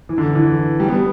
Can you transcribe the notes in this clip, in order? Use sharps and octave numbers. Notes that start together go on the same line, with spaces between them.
E3
D3
E3
G3
B3